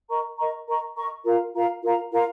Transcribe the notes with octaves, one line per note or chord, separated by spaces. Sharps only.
A#4 D#5 A#5 C#6
A#4 D#5 A#5 C#6
A#4 D#5 A#5 C#6
A#4 D#5 A#5 C#6
F4 A#4 F5 A#5
F4 A#4 F5 A#5
F4 A#4 F5 A#5
F4 A#4 F5 A#5